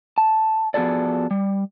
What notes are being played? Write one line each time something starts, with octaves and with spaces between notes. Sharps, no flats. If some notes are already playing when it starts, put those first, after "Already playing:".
A5
F3 B3 F#4 G#4 A4 D5
G3